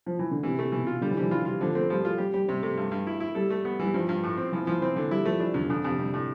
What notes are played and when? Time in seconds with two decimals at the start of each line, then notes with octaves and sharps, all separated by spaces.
0.06 F3
0.19 E3
0.31 D3
0.43 C3 E3
0.59 C3 A3
0.72 B2 E3
0.87 B2 F4
1.01 D3 G3
1.11 E3
1.17 F3 G3
1.21 E3
1.31 E3 F4
1.45 G3 F4
1.61 D3 F3
1.75 A3 C4
1.90 F3 G3
2.04 A3 F4
2.18 G3 G4
2.34 G3 G4
2.48 C3 G3
2.63 C3 A3
2.77 G2
2.92 G2
3.07 E4
3.20 E4
3.35 G3 A4
3.50 A3
3.65 B3
3.79 E3 G3
3.94 G2 F3
4.09 G2
4.23 A2
4.37 C4
4.52 E3 F3
4.67 E3 F3
4.82 E3 C4
4.96 D3 E3
5.11 G3 E4
5.25 F3 A3
5.40 E3 D4
5.54 E2 D3
5.69 F2 D3
5.84 F2 C3
5.99 C3 G3
6.14 A2